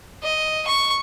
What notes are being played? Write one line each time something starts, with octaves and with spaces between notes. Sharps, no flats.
D#5
C#6